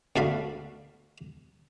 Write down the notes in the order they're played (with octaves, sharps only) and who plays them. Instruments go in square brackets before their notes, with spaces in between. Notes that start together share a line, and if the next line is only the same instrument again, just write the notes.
[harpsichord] D2 D3 D4 F#4 F5 B5